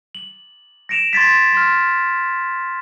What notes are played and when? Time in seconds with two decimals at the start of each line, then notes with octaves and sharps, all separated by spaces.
0.15 F#7
0.89 A#6 C#7 D7 E7 F7
1.13 C6 G#6 A6 B6
1.53 C6 F6